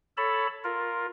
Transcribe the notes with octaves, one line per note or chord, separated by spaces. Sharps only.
A4 C#5 A5 B5
F4 A#4